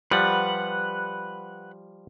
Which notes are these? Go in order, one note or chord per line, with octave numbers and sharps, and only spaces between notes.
F3 G3 B4 F#5